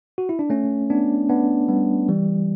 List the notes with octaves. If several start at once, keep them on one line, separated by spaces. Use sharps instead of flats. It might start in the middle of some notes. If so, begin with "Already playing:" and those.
F#4
E4
D4
A3 C#4
B3 D4
B3 D4
G3 B3
E3 G3